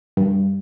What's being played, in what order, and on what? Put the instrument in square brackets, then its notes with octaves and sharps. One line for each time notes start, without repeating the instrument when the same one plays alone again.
[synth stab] G2